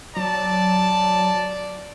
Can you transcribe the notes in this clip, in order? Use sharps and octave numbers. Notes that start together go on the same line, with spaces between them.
F#3 D5 A5